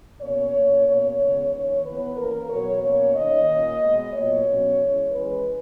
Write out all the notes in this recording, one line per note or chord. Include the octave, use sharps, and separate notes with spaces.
B2 A#3 C#4 C#5
A#2 A#3 C#4
B2 A#3 C#4 C#5
C#3 E3 G#3 B3
D#3 A#3 C#4 C#5
E3 B3 B4
E3 A#3 C#4 A#4
B2 F#3 B3 C#5
B2 A#3 C#4 C#5
D#3 A#3 C#4 D#5
A#2 A#3 C#4
B2 G#3 B3
A#2 F#3 B3 C#5
B2 F#3 C#4
E3 G#3 C#4
E3 G#3 C#4 B4